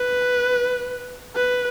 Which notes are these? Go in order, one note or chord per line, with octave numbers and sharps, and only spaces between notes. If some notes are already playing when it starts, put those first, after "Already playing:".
Already playing: B4
B4